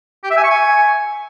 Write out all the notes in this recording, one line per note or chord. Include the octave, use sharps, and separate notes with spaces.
G4
E5
G#5
C#6
G#5